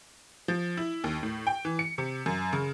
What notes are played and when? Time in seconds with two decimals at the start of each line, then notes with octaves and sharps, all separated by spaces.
0.48 F3
0.77 E4
1.04 D#2
1.23 A2
1.47 G5
1.65 E3
1.79 C#7
1.98 C3
2.26 F#2
2.53 C#3